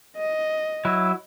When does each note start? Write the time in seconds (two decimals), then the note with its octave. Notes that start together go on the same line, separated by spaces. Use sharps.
0.17 D#5
0.85 F#3 E4